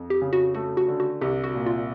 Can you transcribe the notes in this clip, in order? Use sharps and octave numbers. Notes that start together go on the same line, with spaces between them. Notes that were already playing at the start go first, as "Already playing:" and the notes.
Already playing: F2
G4
C#3
F#4
A3 F#4
F#4
D3
F#4
C2 G4
F#4
A#2
F4